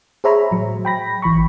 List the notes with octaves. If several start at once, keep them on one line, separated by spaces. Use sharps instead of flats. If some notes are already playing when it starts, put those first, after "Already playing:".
G#4 C5 C#5 E5 A#5 B5
A2 F#3
G5 B5 A#6
G#1 E3 B5 C#6